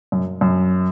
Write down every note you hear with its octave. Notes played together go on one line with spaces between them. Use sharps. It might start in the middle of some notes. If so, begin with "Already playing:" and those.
F#2
F#2